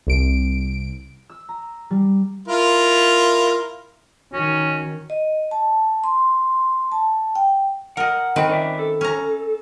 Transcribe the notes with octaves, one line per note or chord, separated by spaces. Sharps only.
C2 D7
E6
A#5
G3
E4 F4 A#4
D#3 C#4 F#4
D#5
A5
C6
A5
G5
A#4 D#5 F#5
D#3 C4 B4
C#4 D5 E5
A4
C#4 A#5